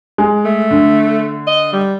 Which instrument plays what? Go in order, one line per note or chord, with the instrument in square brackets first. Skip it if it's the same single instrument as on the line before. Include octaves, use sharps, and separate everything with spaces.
[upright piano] G#3
[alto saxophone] A3
[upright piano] D3
[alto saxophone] D#5
G3